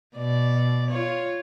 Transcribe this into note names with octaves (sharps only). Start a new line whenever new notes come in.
B2 D5
F4 C#5